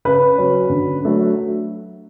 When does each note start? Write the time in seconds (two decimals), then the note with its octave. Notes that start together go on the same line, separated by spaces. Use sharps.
0.05 C#3 B4
0.38 F#3 C#4
0.70 D3
1.02 F#3 A3 D4